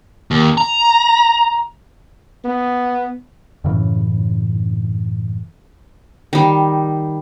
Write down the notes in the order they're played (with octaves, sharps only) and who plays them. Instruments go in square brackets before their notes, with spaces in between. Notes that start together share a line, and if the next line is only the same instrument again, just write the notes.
[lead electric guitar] D#2
A#5
[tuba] B3
[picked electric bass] F#2 A2 C#3 E3
[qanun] D#3 G3